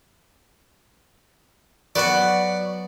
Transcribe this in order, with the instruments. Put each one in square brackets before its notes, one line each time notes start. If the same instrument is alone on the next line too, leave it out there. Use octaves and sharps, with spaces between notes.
[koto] F#3 B3 F#4 [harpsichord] D5 F#5